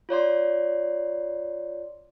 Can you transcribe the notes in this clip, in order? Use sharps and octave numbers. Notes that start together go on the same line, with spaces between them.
F4 C#5 D5 C6